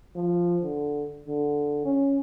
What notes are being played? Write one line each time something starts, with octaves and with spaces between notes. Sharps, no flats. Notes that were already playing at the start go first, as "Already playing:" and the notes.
F3
D3
D3
C#4